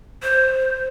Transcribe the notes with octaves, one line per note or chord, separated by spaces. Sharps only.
C5